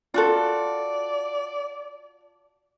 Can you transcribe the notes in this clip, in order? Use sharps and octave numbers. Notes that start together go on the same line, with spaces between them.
F4 F#4 A4 D5